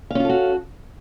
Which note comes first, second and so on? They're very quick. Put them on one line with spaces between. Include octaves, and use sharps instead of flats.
F5 C#4 F4 A4 F#4